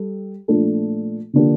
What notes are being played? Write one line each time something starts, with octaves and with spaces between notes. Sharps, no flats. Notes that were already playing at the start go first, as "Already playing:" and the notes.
Already playing: G3 A4
A#2 F3 A3 D4 A4
D3 F3 A#3 D4 G4